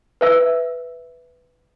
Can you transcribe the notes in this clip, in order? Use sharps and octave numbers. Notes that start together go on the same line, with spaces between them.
B4 E5 E6